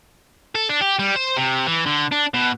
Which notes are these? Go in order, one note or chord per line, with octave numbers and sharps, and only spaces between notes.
A4
D4
G4
G3
C5
C3
E3
D3
D4
B2